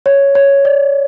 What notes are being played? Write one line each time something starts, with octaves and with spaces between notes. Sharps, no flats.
C#5
C#5
D5